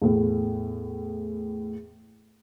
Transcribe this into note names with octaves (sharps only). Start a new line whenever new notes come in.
E2 A2